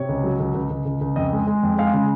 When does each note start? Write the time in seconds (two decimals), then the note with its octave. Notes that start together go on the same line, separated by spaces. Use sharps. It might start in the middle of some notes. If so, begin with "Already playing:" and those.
Already playing: C3 C#5
0.09 C#2
0.24 F#3
0.40 C#2
0.55 C#2
0.70 C#2
0.86 C#2
1.01 C#2
1.16 F2 D#5
1.33 G#3
1.47 G#3
1.63 F2
1.78 G#3 F5
1.94 C#3